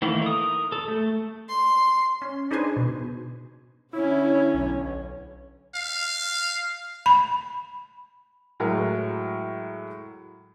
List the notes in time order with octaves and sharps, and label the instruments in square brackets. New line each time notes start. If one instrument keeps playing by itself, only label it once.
[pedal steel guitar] D#3 E3 A3 A#3
A#4 D#6
A4
A3
[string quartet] C6
[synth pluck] C#4
D4 D#4 G#4 B4 C5 G#5
B2
[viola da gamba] D3 C#4 [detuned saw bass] E4 [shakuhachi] C#5
[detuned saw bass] B1
[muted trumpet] F5
[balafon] B5
[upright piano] A2 F#3 G#3 A#4